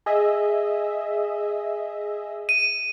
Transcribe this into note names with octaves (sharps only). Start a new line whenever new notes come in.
G#4 D#5 E5
D#7